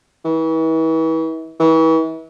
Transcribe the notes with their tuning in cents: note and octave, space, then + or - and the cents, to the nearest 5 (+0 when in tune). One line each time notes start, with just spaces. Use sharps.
E3 -35
E3 -35